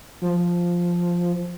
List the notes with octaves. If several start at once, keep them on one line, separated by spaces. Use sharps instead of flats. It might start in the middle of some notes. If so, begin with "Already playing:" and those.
F3